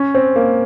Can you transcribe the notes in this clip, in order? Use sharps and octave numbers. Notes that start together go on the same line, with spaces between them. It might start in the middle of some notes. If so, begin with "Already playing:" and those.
Already playing: C#4
C4
A#3